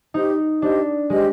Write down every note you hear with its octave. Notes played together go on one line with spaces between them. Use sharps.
D#4 G4 C5 D#5
D4 G4 C5 D#5
G#3 G4 C5 D#5